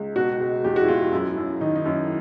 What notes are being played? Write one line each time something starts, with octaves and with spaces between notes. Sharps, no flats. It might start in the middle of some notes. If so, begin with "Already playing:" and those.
Already playing: C#2
B2 F#4
G#3
E2 G4
F#4
E4
E2 F4
F#2 E4
F#2
D#3 D#4
D#4
F#2 E4